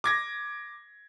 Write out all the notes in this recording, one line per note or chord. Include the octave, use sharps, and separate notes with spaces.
D6 G#6 A#6